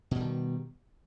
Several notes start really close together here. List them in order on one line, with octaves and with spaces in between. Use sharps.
B2 G3 D#3